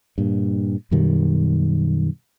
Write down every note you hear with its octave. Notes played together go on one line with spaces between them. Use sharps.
G2 A#2
F#2 B2 D#3 G3